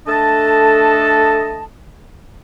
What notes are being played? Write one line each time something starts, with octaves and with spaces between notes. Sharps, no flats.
A3 D4 A4 D#5 A5